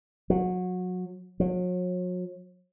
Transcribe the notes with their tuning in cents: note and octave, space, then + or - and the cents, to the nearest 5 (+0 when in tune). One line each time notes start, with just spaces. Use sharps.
F#3 -25
F#3 -40